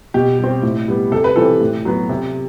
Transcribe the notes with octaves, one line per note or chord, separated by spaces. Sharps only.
B2 G4
G3 C4
A2
G3 B3
C3 A4
B4
E3 G3 C4 A4
A2
F#3 B3
C3